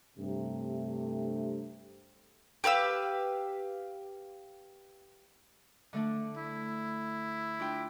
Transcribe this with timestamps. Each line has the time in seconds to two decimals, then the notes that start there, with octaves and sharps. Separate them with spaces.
0.18 G2 C3 A3
2.64 G4 B4 F5 E6
5.93 D3 A3 D4
6.38 E4
7.60 D4 F4 G5